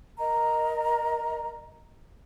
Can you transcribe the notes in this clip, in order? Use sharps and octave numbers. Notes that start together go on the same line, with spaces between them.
A#4 D#5 A#5